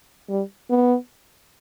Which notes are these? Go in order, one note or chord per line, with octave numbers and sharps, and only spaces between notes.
G3
B3